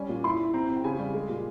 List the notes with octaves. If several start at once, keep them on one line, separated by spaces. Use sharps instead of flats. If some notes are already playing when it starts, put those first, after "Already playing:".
Already playing: G3 C#4 G#5
A#2
E4 C6
E4
C4 A#5
C4
G5
C#3 G#5
G3
G#3
A#2